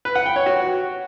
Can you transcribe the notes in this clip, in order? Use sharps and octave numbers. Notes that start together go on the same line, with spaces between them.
B4
F#5
G5
C#5
F#4